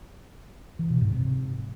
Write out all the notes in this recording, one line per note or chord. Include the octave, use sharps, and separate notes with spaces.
E3
B2
G#2
C3